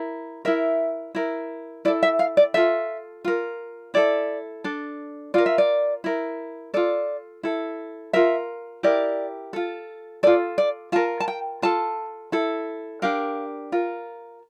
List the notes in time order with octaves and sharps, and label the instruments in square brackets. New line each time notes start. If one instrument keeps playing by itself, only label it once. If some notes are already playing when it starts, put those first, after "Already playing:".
Already playing: [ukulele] E4 A#4
E4 A#4 E5
E4 A#4
E4 A4 D5
E5
F5
D5
F4 A4 E5
F4 A#4
E4 A4 D5
D4 A4
F4 A#4 D5
E5
D5
E4 A#4
F4 A4 D5
E4 A4
F4 A#4 E5
E4 G4 A#4 D5
F4 A4
F4 A4 D5
D5
F4 A#4 A5
A5
G5
F4 A4 A5
E4 A4
D4 G4 A#4 F5
F4 A#4